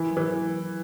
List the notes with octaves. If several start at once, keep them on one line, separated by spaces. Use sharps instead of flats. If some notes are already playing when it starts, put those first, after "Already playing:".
Already playing: E3
F#3
E3